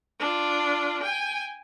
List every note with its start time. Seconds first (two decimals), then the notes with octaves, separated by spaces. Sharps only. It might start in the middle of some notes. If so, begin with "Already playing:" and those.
0.20 D4 F4
1.03 G5 G#5